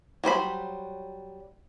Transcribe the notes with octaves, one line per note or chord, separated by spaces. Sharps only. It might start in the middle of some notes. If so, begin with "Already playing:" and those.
F#3 G3 C5 B5